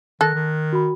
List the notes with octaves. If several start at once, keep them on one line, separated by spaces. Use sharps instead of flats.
D#3 A4 F#6 A#6
D#3
F#4 B5